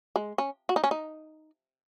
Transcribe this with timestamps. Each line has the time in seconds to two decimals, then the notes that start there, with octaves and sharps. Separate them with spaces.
0.16 G#3
0.38 C#4
0.69 F#4
0.76 D#4
0.84 C#4
0.91 D#4